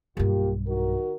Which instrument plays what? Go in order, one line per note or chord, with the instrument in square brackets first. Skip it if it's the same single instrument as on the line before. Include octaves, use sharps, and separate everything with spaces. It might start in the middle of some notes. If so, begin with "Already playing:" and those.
[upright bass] B1 G2 [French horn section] A#3 F4 G4
[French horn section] D#3 F#4 A#4